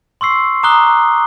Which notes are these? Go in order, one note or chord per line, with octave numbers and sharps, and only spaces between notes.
C6 C#6 E6 C7
A#5 D6 D#6 F#6 G7